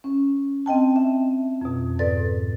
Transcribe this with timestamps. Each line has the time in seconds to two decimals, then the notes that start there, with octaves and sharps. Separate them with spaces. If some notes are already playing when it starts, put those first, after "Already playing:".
0.04 C#4
0.66 C4 D#5 G5 A5
0.96 E5
1.61 F2 B2
1.99 G#2 A4 B4 D5 A6